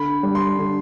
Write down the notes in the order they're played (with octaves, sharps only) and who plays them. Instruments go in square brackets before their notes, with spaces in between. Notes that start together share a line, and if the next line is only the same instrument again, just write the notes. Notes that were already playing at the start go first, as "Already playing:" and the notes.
Already playing: [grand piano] D3 B5
G3
C6
D3